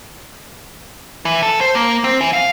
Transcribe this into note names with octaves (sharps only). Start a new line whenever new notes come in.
E3
A4
C5
A#3
C4
E3
F5